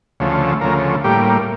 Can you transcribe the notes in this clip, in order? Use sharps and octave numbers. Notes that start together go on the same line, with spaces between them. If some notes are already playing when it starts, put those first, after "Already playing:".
D2 C#3 F3 A3
D2 C#3 F3 A3 A#4
A2 G3 A#3 G4